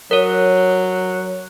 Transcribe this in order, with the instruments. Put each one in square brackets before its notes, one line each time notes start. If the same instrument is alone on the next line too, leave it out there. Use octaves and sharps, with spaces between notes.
[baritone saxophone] F#3 [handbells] A#4 C#5